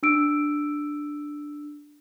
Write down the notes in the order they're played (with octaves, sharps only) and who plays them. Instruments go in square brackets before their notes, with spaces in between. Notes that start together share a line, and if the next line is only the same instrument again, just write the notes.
[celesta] D4 E6 D7